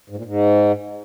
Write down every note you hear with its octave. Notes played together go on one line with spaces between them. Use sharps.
G#2
A#2
G#2